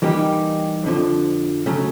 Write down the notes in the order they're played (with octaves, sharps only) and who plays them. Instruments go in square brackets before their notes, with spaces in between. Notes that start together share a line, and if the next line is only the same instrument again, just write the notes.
[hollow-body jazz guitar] E3 G3 A#3 D#4 G4
F2 D3 F3
C#3 F#3 A3